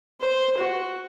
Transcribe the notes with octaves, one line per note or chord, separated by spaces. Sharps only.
C5
F#4